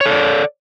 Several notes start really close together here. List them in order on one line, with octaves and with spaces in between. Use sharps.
C#5 A4 D5